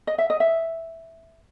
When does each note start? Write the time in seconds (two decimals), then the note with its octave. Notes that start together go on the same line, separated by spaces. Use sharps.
0.07 D#5
0.18 E5
0.30 D#5
0.40 E5